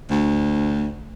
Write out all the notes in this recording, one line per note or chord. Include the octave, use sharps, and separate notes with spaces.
D2